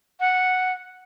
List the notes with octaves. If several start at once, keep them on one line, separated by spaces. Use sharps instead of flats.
F#5